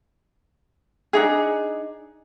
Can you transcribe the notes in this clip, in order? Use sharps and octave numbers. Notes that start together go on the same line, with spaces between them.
D4 D#4 G#4